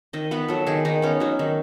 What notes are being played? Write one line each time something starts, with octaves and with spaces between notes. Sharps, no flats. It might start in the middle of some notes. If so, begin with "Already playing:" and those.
D#3 D#5
B3 B4
F#3 A4
D#3 G#4
D#3 D#4
B3 C#4
F#3 D#4
D#3